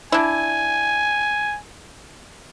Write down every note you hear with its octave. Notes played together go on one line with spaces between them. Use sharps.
D4 E4 G#5